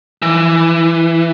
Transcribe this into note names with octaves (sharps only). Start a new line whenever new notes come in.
E3